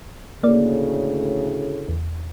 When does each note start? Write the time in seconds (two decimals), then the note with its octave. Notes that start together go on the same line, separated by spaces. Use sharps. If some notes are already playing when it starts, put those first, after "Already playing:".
0.43 D2 A2 C#3 A#3 D5
1.88 E2